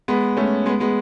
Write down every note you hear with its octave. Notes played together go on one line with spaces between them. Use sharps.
G#3 B3
A3 C#4
G#3 B3
G#3 B3